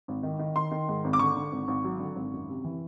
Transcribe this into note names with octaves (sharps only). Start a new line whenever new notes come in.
G#1
D#3
D#3
D#3 C6
D#3
G#2
G#1
D6
D3 C#6
D3
G#1
G#1
F#3
D3
G#1
F#2
C3
E3